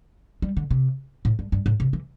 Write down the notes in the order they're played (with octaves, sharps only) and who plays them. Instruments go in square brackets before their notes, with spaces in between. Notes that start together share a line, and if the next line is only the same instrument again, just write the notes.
[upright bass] G3
D3
C3
A2
G2
G2
A2
C3
E3